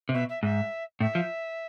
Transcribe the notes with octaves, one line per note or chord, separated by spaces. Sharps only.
C3
B2 E5
E5
G#2 E5
A2 E5
F3